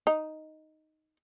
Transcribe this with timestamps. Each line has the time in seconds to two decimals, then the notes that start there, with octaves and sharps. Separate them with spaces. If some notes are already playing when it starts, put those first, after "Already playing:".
0.07 D#4